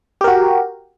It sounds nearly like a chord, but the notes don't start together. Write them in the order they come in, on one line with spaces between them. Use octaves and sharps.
G4 A#4 F#4